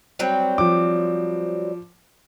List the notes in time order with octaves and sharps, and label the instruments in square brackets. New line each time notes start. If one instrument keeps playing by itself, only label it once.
[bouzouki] F#3 G3 C4
[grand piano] F3 D6